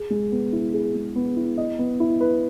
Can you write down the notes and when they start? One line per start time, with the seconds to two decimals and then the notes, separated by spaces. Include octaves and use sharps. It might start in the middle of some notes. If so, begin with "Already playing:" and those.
Already playing: G#4
0.10 G#3
0.32 B3
0.53 E4
0.74 G#4
0.95 G#3
1.16 B3
1.36 E4
1.58 D#5
1.79 B3
2.00 E4
2.21 B4